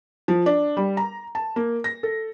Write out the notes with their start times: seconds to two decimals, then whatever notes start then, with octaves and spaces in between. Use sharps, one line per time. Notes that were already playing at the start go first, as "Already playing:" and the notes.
0.28 F3
0.46 D4
0.77 G3
0.97 A#5
1.35 A5
1.56 A#3
1.84 A#6
2.03 A4